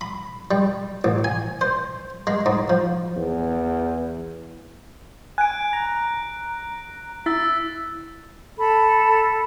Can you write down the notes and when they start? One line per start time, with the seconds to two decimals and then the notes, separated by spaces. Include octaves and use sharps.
0.01 B5
0.51 G3
1.04 A1
1.24 G#5
1.61 C5
2.27 G#3
2.46 G#2
2.70 F3
3.16 E2
5.38 G#5 F#6 D7
5.73 A#5
7.26 E4 E6 A6 B6
8.58 A4 B5